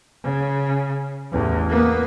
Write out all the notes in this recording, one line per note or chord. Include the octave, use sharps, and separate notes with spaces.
C#3
A1 E2
A#3 B3